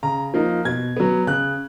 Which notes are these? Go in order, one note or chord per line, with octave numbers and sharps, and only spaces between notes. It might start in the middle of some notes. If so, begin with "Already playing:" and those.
C#3 A#5
F3 A#3 D#4
B2 G#6
F#3 B3
C#3 F#6